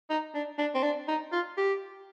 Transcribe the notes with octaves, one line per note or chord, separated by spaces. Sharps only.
D#4
D4
D4
C4
D4
D#4
F4
G4